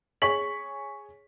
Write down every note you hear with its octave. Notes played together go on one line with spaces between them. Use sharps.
G#4 C#5 C#6 B6 F#7